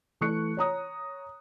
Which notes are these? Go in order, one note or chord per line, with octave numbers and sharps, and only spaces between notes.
E3 A3 C#6 F#6 C#7
C#5 A#5 D#6